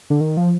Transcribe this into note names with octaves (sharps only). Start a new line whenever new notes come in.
D3
D#3
F3